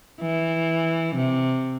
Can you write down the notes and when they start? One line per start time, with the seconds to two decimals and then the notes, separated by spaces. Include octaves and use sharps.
0.21 E3
1.15 C3